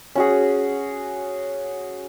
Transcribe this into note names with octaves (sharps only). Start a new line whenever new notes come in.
C#4 F#4 G#4